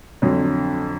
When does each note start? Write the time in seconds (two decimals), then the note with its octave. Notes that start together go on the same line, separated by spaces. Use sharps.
0.22 F2 D3 F#3